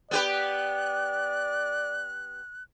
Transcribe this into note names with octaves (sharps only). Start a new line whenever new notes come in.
B3 G4 B4 D5 F#6